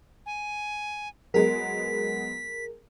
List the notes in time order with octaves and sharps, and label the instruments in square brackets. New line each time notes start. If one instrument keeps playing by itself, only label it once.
[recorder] G#5
[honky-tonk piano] F#3 G#3 B3 [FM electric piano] G#4 A#4 [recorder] B6